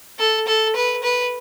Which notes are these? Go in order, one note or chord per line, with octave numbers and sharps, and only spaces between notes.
A4
A4
B4
B4